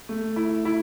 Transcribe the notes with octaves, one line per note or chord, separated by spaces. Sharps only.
A3
E4
E4